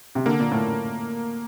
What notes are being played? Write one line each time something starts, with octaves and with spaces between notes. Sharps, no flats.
C3
D3 A#3
A#2
A2